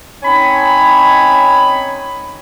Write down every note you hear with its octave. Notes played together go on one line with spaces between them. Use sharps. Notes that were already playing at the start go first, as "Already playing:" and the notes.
C4 C#4 D#4 C#5 G#5 B5